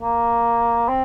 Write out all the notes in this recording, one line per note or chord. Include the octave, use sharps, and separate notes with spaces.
A#3
C4